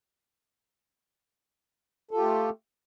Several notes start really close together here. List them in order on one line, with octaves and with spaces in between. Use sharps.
A4 F4 G4 A3